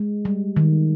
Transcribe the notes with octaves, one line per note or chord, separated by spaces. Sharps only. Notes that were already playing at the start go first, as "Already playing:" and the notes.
Already playing: G#3
G3
D#3